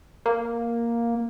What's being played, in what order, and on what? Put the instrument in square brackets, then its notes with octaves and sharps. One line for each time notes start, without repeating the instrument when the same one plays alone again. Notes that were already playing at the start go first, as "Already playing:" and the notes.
[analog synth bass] A#3